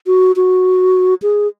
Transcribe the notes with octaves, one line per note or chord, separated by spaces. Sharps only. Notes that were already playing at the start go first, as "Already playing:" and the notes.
F#4
F#4
G#4